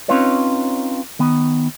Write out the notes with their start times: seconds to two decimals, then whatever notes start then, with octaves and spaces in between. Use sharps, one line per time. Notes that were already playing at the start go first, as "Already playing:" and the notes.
0.08 C4 C#4 D#4 F4 B4 C#5
1.19 D#3 B3